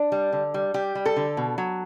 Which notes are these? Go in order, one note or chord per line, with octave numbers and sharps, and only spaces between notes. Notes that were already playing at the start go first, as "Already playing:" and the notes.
Already playing: D4
G3
D3
G3
G3 G4
G3
A4
D3
B2
F#3